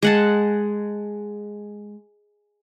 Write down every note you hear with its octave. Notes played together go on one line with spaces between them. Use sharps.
G#3 F#5 A5